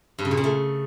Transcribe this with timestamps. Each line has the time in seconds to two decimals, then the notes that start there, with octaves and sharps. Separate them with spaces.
0.19 G2
0.25 C#3
0.31 A#2
0.37 C#3
0.44 A3